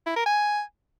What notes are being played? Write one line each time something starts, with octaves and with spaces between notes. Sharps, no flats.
E4
A#4
G#5